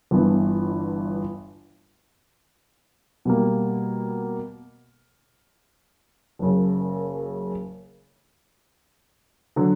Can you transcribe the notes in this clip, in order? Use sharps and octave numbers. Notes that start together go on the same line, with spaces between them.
G1 G2 E3 B3
B2 G3 A#3
F#1 F#2 C#3
D3 F#3